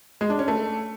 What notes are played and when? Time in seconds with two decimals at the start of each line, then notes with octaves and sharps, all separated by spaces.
0.21 G#3
0.30 D4
0.39 C#4
0.48 A3